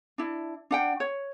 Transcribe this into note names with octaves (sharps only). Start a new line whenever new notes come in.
D4 E4
D4 F#5 G5
C#5